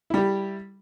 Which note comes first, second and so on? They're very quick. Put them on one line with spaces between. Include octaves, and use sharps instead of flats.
E4 G3 G4